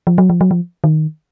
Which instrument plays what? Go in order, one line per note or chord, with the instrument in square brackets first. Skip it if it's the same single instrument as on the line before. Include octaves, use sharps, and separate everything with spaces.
[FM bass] F3
F#3
F3
F#3
F3
D#3